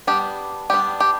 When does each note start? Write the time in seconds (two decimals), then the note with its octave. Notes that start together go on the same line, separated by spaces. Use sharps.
0.07 G3 B3 D4 G4
0.70 G3 B3 D4 G4
1.00 G4